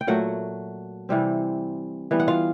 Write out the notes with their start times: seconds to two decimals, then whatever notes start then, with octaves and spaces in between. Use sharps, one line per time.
0.01 G5
0.07 A#2 F#3 A3 F#4 F#5
1.09 C3 E3 G3 C4
2.11 E3 G3 B3
2.20 F#5
2.28 F4 F5